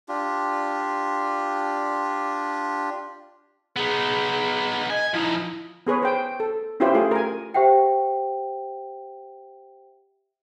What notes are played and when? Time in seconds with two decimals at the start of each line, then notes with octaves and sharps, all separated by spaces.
0.09 D4 F4 G4
3.76 B3 D#4 G#4
4.90 D#5 G#5
5.14 F3 D#4 E4
5.87 B3 G#4 B4 C#5
6.03 C5 G5
6.40 A4
6.80 C#4 E4 F4 G4 B4 C5
6.95 A3 F4 G#4
7.11 A#4 G#5
7.54 G4 C5 E5 F#5 G5